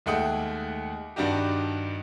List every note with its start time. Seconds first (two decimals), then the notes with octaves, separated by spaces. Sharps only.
0.06 D#2 G#3 A3 F#5 G5 D#6
1.16 G2 D#3 D4 D#4 F#4 G4